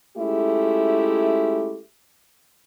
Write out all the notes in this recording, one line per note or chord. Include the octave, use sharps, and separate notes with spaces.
G#3 A3 C#4 E4 F4 G4